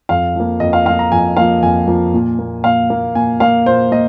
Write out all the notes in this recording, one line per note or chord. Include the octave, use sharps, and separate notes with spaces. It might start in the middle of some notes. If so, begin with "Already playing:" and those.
F2 F5
F3 A#3
F2 D#5
F5
F3 A#3 F5
A#5
F2 G#5
F3 A#3 F5
F2 G#5
F3 A#3
A#2
A#3
A#2 F5
A#3
A#2 G#5
A#3 F5
A#2 C5
A#3 D#5